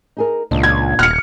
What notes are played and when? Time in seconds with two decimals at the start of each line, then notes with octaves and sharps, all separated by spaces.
0.17 D#4 G#4 A#4
0.51 C#2 A#2 D4 D#5
0.63 G#6
0.99 D#1 F6 C#7